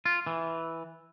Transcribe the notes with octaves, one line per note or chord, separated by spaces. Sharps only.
F4
E3